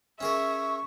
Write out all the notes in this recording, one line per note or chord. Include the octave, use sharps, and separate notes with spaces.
C#4 G#4 A#4 E5 C#6